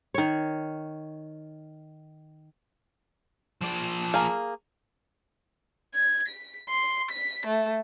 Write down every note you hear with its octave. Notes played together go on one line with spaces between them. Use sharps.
D#3 C#5
F3 D5
A#3 G#4 F5
G#6
B6
C6
B6
A3